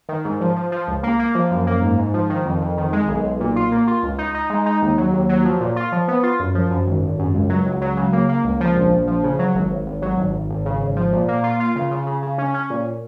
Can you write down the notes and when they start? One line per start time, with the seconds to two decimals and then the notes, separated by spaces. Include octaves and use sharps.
0.09 D#3
0.25 G#2
0.41 F3
0.56 F3
0.72 F3
0.88 C#2
1.03 A#3
1.19 A#3
1.35 F3
1.51 F#2
1.67 A#3
1.82 G#2
1.98 G#2
2.14 F3
2.30 D#3
2.46 F2
2.61 F2
2.77 D#3
2.93 G#3
3.08 B1
3.24 B1
3.40 A#2
3.56 F4
3.72 A#3
3.87 F4
4.03 C#2
4.18 D#4
4.34 D#4
4.50 G#3
4.66 D#4
4.82 D#2
4.98 F#3
5.13 D#2
5.29 F#3
5.45 F3
5.61 A#2
5.76 F4
5.92 F3
6.08 B3
6.23 F4
6.40 F#2
6.55 F3
6.71 F#2
6.87 G#1
7.03 G#1
7.19 F#2
7.34 C#2
7.49 F#3
7.65 C#2
7.81 F#3
7.97 C#3
8.13 A#3
8.29 A#3
8.44 C#2
8.60 F3
8.76 A#1
8.91 A#1
9.07 F3
9.23 C#3
9.39 F#3
9.55 G#1
9.70 G#1
9.87 G#1
10.02 F#3
10.18 G#1
10.34 G#1
10.50 G#1
10.65 C#3
10.81 G#1
10.96 F3
11.13 A#2
11.28 A#3
11.43 F4
11.60 F4
11.76 C#3
11.91 C#3
12.07 C#3
12.22 C#3
12.38 C#4
12.54 C#4
12.70 A#2